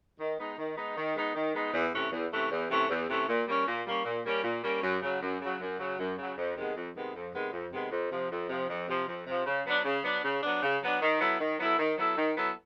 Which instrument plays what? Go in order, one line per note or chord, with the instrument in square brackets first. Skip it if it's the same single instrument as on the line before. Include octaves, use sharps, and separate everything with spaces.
[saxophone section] D#3
G#3 B3 D#4
D#3
G#3 B3 D#4
D#3
G#3 B3 D#4
D#3
G#3 B3 D#4
E2
C3 E3 A3 C#4
E2
C3 E3 A3 C#4
E2
C3 E3 A3 C#4
E2
C3 E3 A3 C#4
A#2
G3 A#3 C#4
A#2
G3 A#3 C#4
A#2
G3 A#3 C#4
A#2
G3 A#3 C#4
F#2
C#3 F#3
F#2
C#3 F#3
F#2
C#3 F#3
F#2
C#3 F#3
F2
C3 D#3 G#3 B3
F2
C3 D#3 G#3 B3
F2
C3 D#3 G#3 B3
F2
C3 D#3 G#3 B3
F2
C3 F3
F2
C3 F3
F2
C3 F3
F2
C3 F3
C#3
F#3 B3 D4
C#3
F#3 B3 D4
C#3
F#3 B3 D4
C#3
F#3 B3 D4
D#3
F#3 B3 E4 A4
D#3
F#3 B3 E4 A4
D#3
F#3 B3 E4 A4
D#3
F#3 B3 E4 A4